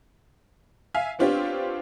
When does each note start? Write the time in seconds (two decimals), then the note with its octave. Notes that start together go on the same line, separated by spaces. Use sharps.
0.94 E5 F5 G#5
1.19 B3 C4 D4 F4 G4 C#5